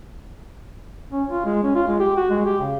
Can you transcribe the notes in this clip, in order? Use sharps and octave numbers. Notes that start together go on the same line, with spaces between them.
C#4
F4
G#3
C#4
F4
G#3
G4
F#4
G#3
G4
C#3